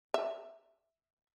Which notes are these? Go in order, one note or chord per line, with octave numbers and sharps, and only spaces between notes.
E5